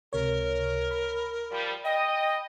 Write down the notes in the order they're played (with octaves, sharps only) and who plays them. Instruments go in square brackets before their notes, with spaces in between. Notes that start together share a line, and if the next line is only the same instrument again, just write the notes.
[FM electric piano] C#2 C3 C#5 [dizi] A#4
[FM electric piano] B5
[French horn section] F3 G3
[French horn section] D#5 [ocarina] G5